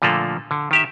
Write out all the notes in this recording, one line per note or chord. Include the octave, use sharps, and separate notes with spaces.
A#2 D3 F3 A3 A#3
D3
D#3 G4 E5